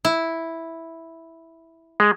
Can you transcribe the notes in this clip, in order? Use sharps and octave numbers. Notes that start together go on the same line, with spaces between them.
E4
G#3